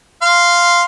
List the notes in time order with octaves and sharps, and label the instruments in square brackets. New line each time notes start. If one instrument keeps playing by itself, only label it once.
[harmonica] F5 C6